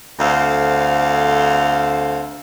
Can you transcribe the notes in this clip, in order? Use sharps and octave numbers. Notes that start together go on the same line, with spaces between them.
D2 C4 A4 C5 F5